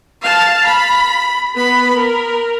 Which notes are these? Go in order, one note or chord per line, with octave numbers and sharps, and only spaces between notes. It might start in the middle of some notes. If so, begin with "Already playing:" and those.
F5 A5
B5
B3 B5
A#4